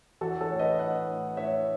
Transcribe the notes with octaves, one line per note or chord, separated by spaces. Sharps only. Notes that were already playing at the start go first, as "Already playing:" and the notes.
E3 F#4 A4
A4 C#5
A2
B4 D#5
A2 D#5 F#5
A2
A2 C#5 E5